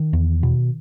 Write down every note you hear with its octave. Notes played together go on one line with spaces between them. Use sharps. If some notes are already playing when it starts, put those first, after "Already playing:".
Already playing: D#3
E2
B2